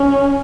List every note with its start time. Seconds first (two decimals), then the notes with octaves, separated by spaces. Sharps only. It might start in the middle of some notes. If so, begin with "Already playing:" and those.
Already playing: C#4